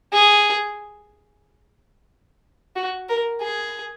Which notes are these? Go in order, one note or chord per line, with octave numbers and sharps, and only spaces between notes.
G#4
F#4
A#4
G#4